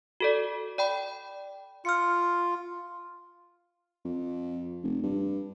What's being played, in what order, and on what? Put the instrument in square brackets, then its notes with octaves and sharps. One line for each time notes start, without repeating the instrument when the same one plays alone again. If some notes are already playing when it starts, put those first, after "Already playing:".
[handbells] F#4 A4 D5
D5 G5 B5
[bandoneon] F4 [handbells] F6 C#7
[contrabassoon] F2
F1
G2